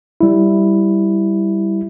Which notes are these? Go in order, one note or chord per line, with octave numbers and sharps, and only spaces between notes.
G3 E4